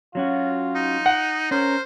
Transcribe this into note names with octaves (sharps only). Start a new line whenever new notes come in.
F#3 C#4 F4 F#4
D#4
F#5
C#4 A#4 C5